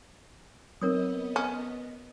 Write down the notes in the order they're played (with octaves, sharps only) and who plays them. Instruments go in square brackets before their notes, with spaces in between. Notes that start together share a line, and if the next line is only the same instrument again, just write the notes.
[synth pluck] F#3 C4 D#4 [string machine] B3 D#5 [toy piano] A#4 C#5 D#6
[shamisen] C#4